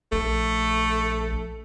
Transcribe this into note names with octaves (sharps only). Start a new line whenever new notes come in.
A#1 A3